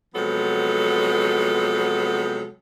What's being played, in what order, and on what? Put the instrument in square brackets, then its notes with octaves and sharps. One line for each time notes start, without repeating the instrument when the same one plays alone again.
[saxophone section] C3 F3 F#3 G#3 B3 A4